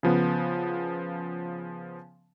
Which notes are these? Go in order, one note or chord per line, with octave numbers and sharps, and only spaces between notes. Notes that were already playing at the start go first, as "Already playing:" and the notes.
C#3 F3 B3